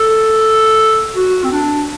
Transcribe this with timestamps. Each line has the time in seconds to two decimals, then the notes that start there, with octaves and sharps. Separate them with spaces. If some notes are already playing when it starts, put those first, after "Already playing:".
Already playing: A4
1.15 F#4
1.44 C4
1.52 D4